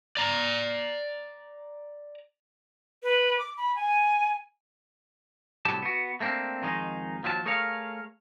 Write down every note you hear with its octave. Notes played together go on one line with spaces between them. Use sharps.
D5 A#5
B4
D6
B5
G#5
C2 A2 F#3 G4 A5
B3 F#4
A3 A#3 C4 D4
F2 D#3 G#3 D#4
D#2 F3 F#3 G#4 A5
A3 G#4 A#4 C#5 F5